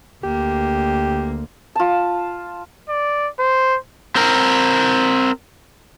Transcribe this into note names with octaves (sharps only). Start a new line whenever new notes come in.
D2 A#3 G4
F4 A5
D5
C5
C4 A#4